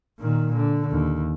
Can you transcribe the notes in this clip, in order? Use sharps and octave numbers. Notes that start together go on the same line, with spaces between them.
A#2 D#3
D3
D#2